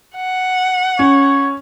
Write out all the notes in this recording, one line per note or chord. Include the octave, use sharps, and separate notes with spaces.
F#5
C#4 C#5